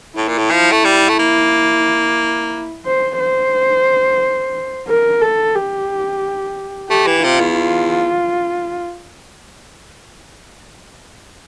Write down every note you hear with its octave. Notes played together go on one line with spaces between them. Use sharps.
A2 E4
A#2
A2
F3
A3
G3
A3
A#3
C5
C5
A#4
A4
G4
A3 G4
E3
C3 F4
E2
F4